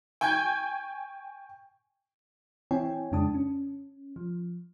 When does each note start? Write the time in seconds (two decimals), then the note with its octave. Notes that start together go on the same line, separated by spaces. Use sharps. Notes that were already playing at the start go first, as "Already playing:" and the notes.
0.21 G5 G#5 C#6 G6 G#6
2.71 E3 C4 E4 C#5 G5 G#5
3.12 F2 C#3 G#3 D4 A5 D#6
3.34 C#4
4.16 F3